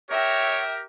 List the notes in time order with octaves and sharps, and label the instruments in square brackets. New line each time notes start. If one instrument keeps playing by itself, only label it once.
[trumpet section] G4 A#4 [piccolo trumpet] C#5 [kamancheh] E5 G5